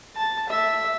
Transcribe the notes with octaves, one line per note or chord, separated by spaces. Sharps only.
A5
E5